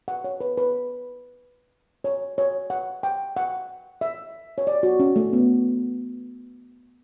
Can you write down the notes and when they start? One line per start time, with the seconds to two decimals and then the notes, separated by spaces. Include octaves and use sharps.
0.08 F#5
0.24 C#5
0.41 B4
0.57 B4
2.04 C#5
2.38 C#5
2.70 F#5
3.03 G5
3.37 F#5
4.01 E5
4.58 C#5
4.67 D5
4.83 F#4
5.00 C#4
5.16 A3
5.33 B3